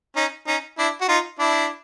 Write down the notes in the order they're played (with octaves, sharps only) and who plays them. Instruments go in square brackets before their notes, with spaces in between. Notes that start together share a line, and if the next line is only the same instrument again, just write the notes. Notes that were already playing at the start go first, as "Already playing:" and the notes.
[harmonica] C#4 D#4
C#4 D#4
D4 E4
F#4
D#4 F4
D4 E4